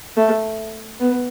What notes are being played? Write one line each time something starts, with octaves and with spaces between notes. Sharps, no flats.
A3
B3